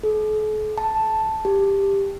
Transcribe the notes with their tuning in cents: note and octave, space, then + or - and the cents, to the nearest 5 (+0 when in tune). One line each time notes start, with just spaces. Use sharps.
A4 -45
A5 +0
G4 +10